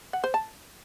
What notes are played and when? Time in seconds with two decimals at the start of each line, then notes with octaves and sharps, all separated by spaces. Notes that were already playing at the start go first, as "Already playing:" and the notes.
0.13 F#5
0.24 C5
0.34 A5